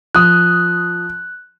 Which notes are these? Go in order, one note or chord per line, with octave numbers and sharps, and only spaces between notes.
F3 D#6 F#6